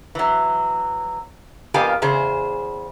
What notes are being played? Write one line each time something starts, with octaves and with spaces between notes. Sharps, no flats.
E3 F#3
F2 A#3 B3 G4 F5 G#5
E2 C#3 G#4 C5